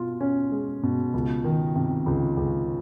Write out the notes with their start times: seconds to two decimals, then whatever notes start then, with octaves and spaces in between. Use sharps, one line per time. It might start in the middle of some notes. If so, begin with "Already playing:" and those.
Already playing: B2 F4
0.21 C#4
0.52 G#3
0.83 B2
1.14 C#2
1.44 D#3
1.76 C3
2.06 C#2
2.37 C#2